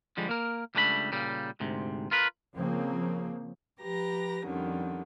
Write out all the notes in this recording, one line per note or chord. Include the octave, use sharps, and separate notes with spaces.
D3 F3 G3 G#3
A#3 A#4
C#2 G3 A3 D4 F#5 B5
A#2 C#3 G3
D2 G#2 C3
F4 A#4 B4
C#3 F3 A#3 C4
F3 G4 B4 A#5 A#6
F2 D3 D#3 G3 C#4